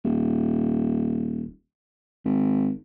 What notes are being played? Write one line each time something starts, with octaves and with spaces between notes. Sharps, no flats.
D#1
G#1